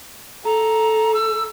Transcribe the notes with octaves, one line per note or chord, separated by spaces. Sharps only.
A4 A#5
E6